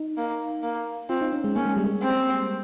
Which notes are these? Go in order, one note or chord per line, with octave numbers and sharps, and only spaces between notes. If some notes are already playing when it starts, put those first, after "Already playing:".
Already playing: D#4
A#3
A#3
C4 F4
D#4
C#4
G#3
A#3 C#4
G#3
G3
G#3
C4